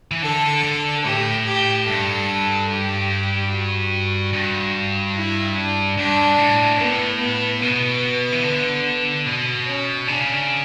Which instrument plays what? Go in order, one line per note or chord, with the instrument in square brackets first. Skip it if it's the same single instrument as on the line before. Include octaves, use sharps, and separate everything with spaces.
[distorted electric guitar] E3
[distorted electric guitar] D3 [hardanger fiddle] A4
[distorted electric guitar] D3
[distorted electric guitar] A2 [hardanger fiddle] G4
[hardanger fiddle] G4
[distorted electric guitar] G2 [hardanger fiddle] A4
[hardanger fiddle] G4
F#4
[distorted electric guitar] G2
[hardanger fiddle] E4
D4
[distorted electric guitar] G2 [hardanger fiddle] D4
[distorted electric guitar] A2
[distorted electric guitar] A2 [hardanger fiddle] B3
[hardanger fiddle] B3
[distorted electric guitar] B2 [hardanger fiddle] B3
[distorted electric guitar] E3
D3
B2
[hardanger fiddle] C#4
[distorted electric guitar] C#3 [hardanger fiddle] D4